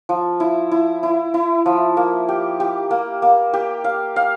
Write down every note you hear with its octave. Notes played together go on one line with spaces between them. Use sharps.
F3
E4
E4
E4
E4
F3
A#3
G4
G4
A#3
A#3
G4
F5
F5